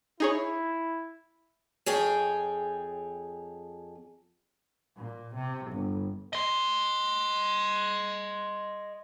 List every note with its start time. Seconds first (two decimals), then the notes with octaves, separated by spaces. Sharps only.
0.20 D#4 E4 G#4 C#5
1.86 F2 G#4 C#5 G5
4.96 A#2
5.35 C3
5.71 G1
6.33 D#5 C6